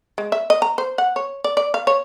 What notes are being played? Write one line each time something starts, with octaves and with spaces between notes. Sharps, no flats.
G#3
E5
D#5
A#5
C5
F#5
C#5
D5
D5
F5
C#5